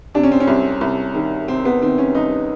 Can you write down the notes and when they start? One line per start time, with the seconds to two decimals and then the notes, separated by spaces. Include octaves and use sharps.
0.15 C3 D4
0.23 C#4
0.32 C4
0.40 C#4
0.47 C2
0.81 C2
1.15 D#3
1.48 C3 C4
1.65 B3
1.82 D#3 C4
1.98 C#4
2.15 C2 D#4